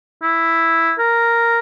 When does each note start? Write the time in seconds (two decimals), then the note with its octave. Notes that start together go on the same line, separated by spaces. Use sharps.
0.23 E4
0.99 A#4